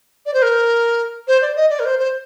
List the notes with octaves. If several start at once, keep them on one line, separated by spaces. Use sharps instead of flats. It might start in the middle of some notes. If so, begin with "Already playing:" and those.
D5
C5
A#4
C5
D5
D#5
D5
A#4
C5
C5